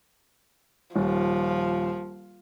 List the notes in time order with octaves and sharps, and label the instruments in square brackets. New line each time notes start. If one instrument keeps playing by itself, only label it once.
[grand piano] D#1 [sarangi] F3